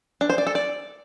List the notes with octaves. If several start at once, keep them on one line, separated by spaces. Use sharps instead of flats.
D4
C5
D5
A4
D5